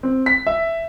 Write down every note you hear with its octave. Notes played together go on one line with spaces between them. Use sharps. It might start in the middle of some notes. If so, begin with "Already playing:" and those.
C4
B6
E5